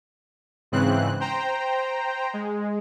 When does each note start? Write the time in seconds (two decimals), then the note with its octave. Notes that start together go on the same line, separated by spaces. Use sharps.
0.72 G#2 C#3 E3 C4 F#6
1.20 C5 G5 A#5
2.34 G#3